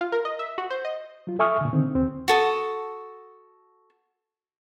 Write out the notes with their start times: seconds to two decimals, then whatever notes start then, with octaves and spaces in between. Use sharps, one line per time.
0.01 F4
0.12 A#4
0.25 D#5
0.39 E5
0.58 F#4
0.70 C5
0.85 D#5
1.27 F#3 F4
1.39 A4 E5 G#5 C#6 D#6 F6
1.61 A#2 D3
1.73 D3 D#3 C4
1.95 D#2 C4
2.28 F#4 A4 D#6